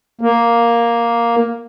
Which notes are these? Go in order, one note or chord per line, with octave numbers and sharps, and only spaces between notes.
A#3